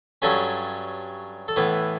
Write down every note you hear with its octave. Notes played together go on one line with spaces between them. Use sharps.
G2 F#3 C#4 A4
A4
A2 E3 B3 B4